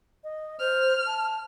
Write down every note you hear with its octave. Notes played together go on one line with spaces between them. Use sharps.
D#5
C5 F6
A5